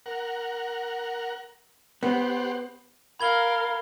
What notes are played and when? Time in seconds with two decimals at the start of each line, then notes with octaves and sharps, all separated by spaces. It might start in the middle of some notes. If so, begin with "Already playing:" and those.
0.06 A#4 F#5
2.03 B3 G4 C5 F#5
3.20 A#4 F5 B5 G#6 G7